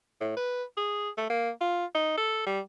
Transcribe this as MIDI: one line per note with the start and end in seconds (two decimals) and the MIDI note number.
0.21 0.33 45
0.37 0.63 71
0.77 1.10 68
1.18 1.28 57
1.30 1.50 58
1.61 1.85 65
1.95 2.16 63
2.17 2.44 69
2.46 2.60 55